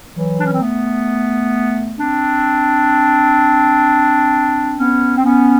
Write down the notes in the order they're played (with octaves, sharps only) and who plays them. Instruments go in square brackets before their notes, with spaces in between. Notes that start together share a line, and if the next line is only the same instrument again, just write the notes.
[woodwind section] E3 F#3
D4
C#4
C4
A3 B3
C4 D4
B3 C#4
C4
B3 C#4